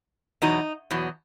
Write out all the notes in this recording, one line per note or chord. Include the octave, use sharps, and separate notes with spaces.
E2 B2 F#3 D#4
E2 B2 F#3